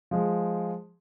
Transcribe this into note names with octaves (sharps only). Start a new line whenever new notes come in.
F3 G#3